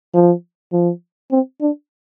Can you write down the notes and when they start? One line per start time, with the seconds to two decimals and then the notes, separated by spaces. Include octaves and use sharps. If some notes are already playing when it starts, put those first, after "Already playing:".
0.14 F3
0.72 F3
1.31 C4
1.61 D4